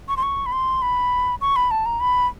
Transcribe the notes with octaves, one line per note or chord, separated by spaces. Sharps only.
C#6
C6
C#6
B5
C6
B5
C#6
B5
A5
A#5
B5